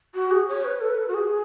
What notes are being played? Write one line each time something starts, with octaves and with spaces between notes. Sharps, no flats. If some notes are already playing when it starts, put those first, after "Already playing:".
F#4
G#4
C#5
B4
A4
B4
A4
F#4
G#4